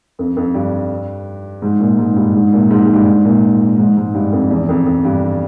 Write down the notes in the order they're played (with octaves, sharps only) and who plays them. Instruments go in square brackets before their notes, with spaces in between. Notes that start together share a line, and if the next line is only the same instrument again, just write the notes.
[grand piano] F2
F2
G2
G#2
A#2
G#2
G2
G#2
A#2
G#2
G#2
G2
G#2
A#2
G#2
G#2
G2
F2
E2
F2
F2
G2